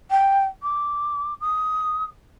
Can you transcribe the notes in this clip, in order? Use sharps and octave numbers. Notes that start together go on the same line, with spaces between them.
G5
D6
D#6